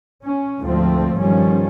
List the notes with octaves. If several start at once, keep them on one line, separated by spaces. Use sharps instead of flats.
C#4
D2 G#2 F3 A3 C4
G1 D#3 F3 G3 C#4